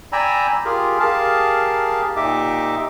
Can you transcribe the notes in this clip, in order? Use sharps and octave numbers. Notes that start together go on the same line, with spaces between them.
D5 G5 G#5 A#5 B5 E6
F4 G4 G#4 A#4
G4 G#4 A#4 F5 A5
A#2 D#4 G4 D#5 E5 D6